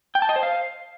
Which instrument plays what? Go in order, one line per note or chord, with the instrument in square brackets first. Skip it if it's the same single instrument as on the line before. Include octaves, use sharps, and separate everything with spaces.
[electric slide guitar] G5
A5
D#5
C5
F5